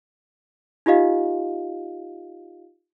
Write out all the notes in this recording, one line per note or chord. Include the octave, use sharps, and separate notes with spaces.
D#4 F4 G4 D#5 F5